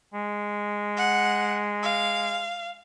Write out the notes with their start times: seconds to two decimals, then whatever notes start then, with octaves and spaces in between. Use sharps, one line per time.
0.14 G#3
0.97 F#5
1.83 F5